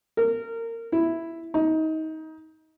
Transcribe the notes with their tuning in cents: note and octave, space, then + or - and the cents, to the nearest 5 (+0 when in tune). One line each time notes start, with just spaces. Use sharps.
A#4 -25
E4 +0
D#4 +25